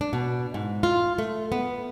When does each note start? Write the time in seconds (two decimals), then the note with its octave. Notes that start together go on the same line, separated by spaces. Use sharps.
0.01 D4
0.13 B2
0.54 G#2
0.83 F4
1.18 A3
1.52 B3